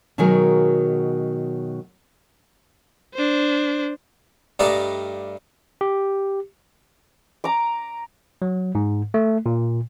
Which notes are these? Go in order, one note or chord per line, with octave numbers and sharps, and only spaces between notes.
B2 D#3 F#3 G#3 G#4 A#4
D4 C5
G2 G3 A3 D5 D#5 A#5
G4
A#5 D6
F#3
G#2
A3
A#2